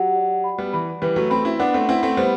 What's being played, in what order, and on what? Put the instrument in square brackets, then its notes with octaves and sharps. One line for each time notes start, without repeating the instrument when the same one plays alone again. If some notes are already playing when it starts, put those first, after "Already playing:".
Already playing: [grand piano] F#3 [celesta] G4 F#5
[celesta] D5
B5
[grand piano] G3 B3
[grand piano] E3 [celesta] B5
[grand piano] E3 G3 [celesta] B4
[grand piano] F#3 A3
[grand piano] A3 C4 [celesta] B5
[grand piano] C4 E4
[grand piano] B3 D4 [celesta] F#5
[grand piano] A3 C4
[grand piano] C4 E4 [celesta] F#5
[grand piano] A3 C4
[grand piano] G3 B3 [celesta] C5